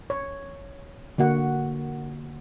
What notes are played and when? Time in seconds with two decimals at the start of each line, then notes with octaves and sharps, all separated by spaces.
0.10 C#5
1.18 D3 A#3 F#4 F#5